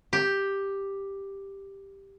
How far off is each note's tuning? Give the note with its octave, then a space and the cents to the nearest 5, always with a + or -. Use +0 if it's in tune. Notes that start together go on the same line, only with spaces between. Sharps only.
G4 +5